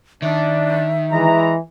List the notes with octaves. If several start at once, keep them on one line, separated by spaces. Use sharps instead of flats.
D#3 D4 E5
E3 G#3 A#5